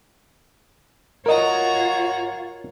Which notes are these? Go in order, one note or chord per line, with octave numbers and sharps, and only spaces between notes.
F4 F#4 A#4 C#5 D#5 A#5